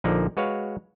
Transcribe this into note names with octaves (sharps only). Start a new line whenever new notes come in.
A#1 D3 F3 A#3 D#4 D5
G#3 F#4 B4 C#5 F5